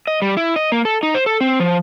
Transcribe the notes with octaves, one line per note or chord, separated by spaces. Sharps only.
D#5
G3
E4
D#5
A#3
A4
D#4
C5
A4
C4
F3